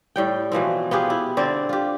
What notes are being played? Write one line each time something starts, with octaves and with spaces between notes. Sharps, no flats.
A2 G3 G5
B2 E3 F3 C4
B3 F4 G4 G#4
E4
D3 C4 D5
F4 G4